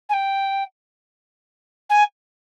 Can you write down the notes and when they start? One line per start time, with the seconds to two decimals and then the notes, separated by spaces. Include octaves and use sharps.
0.09 G#5
0.14 G5
1.90 G#5